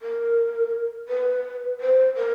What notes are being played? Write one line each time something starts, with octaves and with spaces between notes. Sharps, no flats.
A#4
B4
C5
A#4